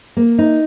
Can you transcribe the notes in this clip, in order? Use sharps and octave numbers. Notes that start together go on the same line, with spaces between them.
A#3
D#4